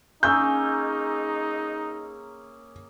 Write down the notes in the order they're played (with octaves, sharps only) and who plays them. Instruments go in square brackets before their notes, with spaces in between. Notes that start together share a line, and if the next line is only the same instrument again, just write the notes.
[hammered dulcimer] A#3 C#4 G#4 [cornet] D#4 [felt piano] E6 G6